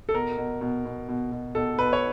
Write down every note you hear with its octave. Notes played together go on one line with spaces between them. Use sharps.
A4
B2 A#4
B2
B2
B2
B2
B2
B2 A4
B2 B4
C#5